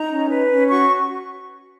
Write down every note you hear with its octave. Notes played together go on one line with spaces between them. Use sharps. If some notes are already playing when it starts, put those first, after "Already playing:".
Already playing: D#4 A#5
C#4
B4
C#4
F#4 C#6